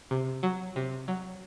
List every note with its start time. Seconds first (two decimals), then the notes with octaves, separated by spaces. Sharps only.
0.11 C3
0.43 F#3
0.76 C3
1.08 F#3